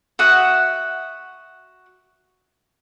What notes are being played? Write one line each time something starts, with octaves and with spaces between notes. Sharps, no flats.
F#4 E5 F#5 D#6